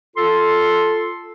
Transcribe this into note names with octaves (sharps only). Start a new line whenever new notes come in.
F4 A4 C6